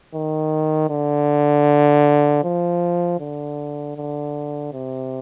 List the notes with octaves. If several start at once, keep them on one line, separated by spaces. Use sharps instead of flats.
D#3
D3
F3
D3
D3
C3